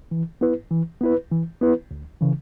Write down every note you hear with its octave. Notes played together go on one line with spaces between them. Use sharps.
E3
B3 E4 B4
E3
B3 E4 B4
E3
B3 E4 B4
D2
C#3 E3